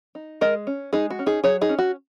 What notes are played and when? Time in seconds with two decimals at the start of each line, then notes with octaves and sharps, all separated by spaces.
0.15 D#4
0.41 G#3 A#4 D#5
0.67 C#4
0.93 G#3 D#4 G#4
1.10 F#4
1.19 C#4
1.26 D#4 G#4
1.44 F#3 G#4 C#5
1.61 D#4 G#4
1.69 C#4
1.79 F#4